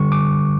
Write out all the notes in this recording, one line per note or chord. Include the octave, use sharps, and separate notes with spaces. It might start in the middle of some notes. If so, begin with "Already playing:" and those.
Already playing: D3 G3 C#6
D6